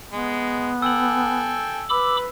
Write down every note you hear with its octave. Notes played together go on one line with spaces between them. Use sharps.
G#3 B3
A4 G5 G#5 E6 F#7
B4 B5 D6 E6